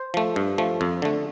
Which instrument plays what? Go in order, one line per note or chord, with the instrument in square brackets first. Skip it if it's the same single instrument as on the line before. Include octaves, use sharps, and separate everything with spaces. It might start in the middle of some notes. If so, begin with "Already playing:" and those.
Already playing: [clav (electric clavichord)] C5
F3 A3
G2
F3 A3
F2
D3 A3